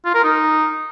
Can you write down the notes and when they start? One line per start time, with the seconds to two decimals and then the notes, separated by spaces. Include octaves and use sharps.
0.05 F4
0.14 A#4
0.24 D#4